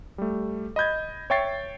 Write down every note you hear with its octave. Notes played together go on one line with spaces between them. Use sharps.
G3 A3
D#5 B5 G6 G#6
C#5 E5 G5 C#6 A6 C7